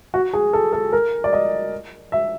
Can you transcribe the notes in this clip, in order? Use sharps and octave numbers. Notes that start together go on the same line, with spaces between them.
F#4
G#4
A4
A4
A#4
D5
D#5
E5